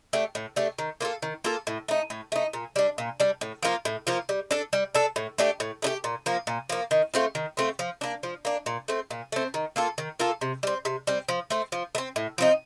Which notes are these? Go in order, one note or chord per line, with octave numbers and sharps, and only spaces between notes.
A3 D4 G4
A2
A3 D4 G4
D#3
A#3 F4 A4
D#3
A#3 F4 A4
A2
A3 D#4
A2
A3 D#4
A#2
G3 D4
A#2
G3 D4
A2
F3 A#3 F4
A2
F3 A#3 F4
G3
D4 A4
G3
D4 A4
A2
A3 D4 G4
A2
A3 D4 G4
A#2
F3 A#3
A#2
F3 A#3
D#3
A3 C4 F4
D#3
A3 C4 F4
F3
A#3 D4
F3
A#3 D4
A#2
A3 C4
A#2
A3 C4
D#3
A#3 F4 A4
D#3
A#3 F4 A4
C3
G3 C4
C3
G3 C4
F3
A3 C4
F3
A3
C4
A2
F3 C4 D#4